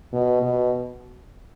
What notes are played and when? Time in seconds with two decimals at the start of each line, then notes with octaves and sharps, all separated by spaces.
0.13 B2
0.42 B2